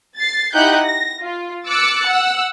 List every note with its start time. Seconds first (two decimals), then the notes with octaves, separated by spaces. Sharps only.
0.17 A6 C7
0.53 D#4 E4 G4 F#5 F#6 G6
0.84 A#6
1.22 F4
1.66 D6 E6 F#6 A6 C#7
2.06 F#5 E6